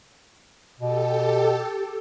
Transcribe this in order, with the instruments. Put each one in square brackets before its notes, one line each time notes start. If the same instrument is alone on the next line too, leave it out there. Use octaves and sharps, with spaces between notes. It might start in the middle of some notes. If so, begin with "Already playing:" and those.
[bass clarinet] B2 [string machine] G4 A4